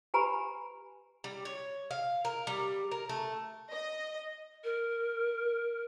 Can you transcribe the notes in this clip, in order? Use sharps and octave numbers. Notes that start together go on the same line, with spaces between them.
G4 B4 G#5 A#5 B5
G3
C#5
F5
A#4
G3
A#4
A3
D#5
A#4